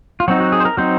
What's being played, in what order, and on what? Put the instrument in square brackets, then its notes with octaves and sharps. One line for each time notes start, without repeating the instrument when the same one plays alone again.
[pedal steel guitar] F4
F#3 C4 D#4 F#4
F#4
G#4
C5
A#4
F#3 C4 D#4 C5